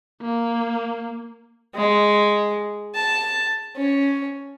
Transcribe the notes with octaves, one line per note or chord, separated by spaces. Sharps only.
A#3
G#3
A5
C#4